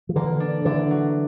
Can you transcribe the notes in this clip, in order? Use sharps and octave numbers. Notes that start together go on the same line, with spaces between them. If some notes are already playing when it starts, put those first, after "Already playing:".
F3
D3 E3 A#3
D4
D3 E3 D4
F#3